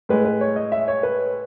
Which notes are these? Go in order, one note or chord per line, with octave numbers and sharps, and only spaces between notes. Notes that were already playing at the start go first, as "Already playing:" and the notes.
A2 G#3 B4
B4
C#5
D#5
E5
C#5
B4